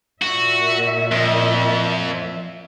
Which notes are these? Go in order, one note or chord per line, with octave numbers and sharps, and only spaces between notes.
A#2 F#4 E5
F2